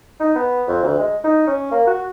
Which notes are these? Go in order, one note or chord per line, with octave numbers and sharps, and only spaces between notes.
D#4
B3
F2
D2
G#3
D#4
C#4
A#3
F#4